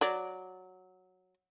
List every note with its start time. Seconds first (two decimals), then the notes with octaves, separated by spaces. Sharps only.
0.01 F#3 D5